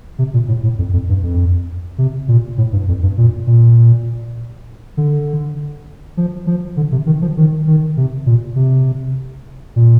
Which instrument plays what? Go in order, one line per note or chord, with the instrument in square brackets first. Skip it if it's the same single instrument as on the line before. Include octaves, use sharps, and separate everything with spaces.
[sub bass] C3
A#2
A2
A2
F2
F2
G2
F2
C3
A#2
A2
G2
F2
G2
A#2
A#2
D3
F3
F3
D3
C3
D#3
F3
D#3
D#3
C3
A#2
C3
A#2